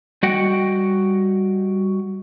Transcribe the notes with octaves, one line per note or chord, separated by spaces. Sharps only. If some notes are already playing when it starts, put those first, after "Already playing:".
G3 F#4 D#5 F#5 G5